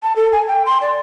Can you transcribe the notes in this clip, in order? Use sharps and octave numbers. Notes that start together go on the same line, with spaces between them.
A5
A4
G#5
G5
C6
D5